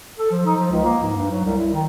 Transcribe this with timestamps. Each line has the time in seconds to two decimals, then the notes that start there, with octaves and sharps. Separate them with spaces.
0.19 A4
0.31 F3
0.46 D#4
0.60 F3
0.72 C#2
0.84 A#3
1.02 G#2
1.17 G2
1.31 F#3
1.45 C2
1.58 E4
1.73 D#3